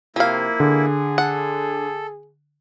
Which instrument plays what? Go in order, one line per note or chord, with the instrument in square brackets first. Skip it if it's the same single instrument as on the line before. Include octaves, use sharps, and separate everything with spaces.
[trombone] C3 [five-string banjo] F3 F5 [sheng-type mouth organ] A#3 E4
[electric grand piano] D3 [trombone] G#4
[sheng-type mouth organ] A4 [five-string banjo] F#5